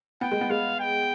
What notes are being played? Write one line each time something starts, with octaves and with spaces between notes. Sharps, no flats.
B3 G5
G#3
B3
G#3 F5
G5